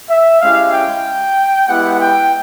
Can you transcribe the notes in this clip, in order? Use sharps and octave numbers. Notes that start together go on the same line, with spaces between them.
E5
G#3 C#4 E4 G4 F5
G5
G#3 B3 E4 G4 F#5
G5